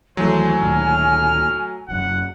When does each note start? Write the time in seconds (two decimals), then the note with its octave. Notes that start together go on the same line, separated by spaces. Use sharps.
0.17 D#2 E3 F#3 A3 C5 G#5
0.61 D2 A#2 D#3 F6
1.88 F1 F#2 F#5